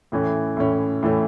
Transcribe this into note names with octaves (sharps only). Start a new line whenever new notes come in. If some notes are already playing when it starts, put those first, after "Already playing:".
A2 E3 A3 C#4
A2 E3 A3 C#4
A2 E3 A3 C#4